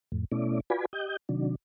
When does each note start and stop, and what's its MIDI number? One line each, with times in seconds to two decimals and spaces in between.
0.12 0.25 41
0.12 0.25 45
0.32 0.60 47
0.32 0.60 57
0.32 0.60 61
0.32 0.60 64
0.32 0.60 74
0.70 0.85 65
0.70 0.85 66
0.70 0.85 71
0.70 0.85 74
0.70 0.85 80
0.70 0.85 83
0.93 1.17 67
0.93 1.17 75
0.93 1.17 91
1.29 1.55 48
1.29 1.55 51
1.29 1.55 54
1.29 1.55 62